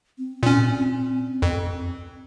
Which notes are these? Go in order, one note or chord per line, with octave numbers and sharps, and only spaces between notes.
C4
A#2 C#4
F2